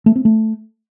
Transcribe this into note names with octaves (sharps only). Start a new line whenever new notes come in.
A3
C4
A3